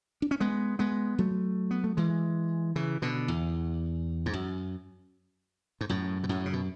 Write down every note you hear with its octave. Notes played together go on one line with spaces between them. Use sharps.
D4
C#4
G#3 B3
G#3 B3
F#3 A3
B3
A3
E3 G#3
C#3 E3
B2 D3
E2
G#2
F#2
G#2
F#2 A2
B2
F#2 A2
C#3
B2